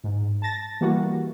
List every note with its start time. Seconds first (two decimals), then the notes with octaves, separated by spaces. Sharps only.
0.04 G#2
0.42 A5 A6 A#6
0.81 E3 G3 A#3 F#4